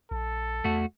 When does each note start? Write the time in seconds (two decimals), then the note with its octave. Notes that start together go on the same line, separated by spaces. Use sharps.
0.11 A#1 A4
0.64 E2 A3 F#4